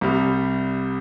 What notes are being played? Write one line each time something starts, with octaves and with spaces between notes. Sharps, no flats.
C2 C3 G3